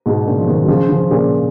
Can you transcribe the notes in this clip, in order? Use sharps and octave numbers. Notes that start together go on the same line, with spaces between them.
G#2 B2
A#2 C#3
F3
B2 D#3
F#3
C#3 F3
C#3 F3
A#2 C#3